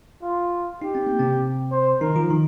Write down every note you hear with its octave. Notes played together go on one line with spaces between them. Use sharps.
F4
D#4 G4
C4
A#3
C3 C4
C5
D#3 D#4 A#4
F3 F4
D#3 D#4